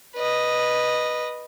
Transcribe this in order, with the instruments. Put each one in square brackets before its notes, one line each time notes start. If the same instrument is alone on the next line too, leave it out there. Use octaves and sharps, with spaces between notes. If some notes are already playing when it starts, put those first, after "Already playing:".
[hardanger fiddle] B4 D#5